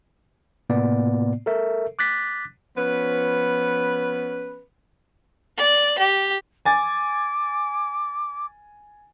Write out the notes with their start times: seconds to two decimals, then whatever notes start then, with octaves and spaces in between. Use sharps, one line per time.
0.70 A2 C3 A#3 B3 D5
1.46 A4 A#4 E5
1.99 D6 F#6 A6 B6
2.77 F3 B3 C#4 B4
5.57 D5
5.98 G4
6.65 G#5 D6 A6